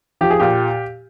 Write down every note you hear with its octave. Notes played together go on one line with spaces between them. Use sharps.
F3 G4
G#4
A#2 G4